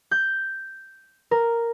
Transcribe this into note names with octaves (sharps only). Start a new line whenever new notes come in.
G6
A#4